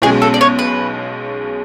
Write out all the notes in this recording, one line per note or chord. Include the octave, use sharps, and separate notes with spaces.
B1 B2 G#3 C#4 G#4
A4
D5
C#5
B4